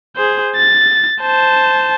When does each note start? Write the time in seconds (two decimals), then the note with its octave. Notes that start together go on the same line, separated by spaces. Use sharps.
0.17 G#4 C5
0.56 A6
1.22 C5 A5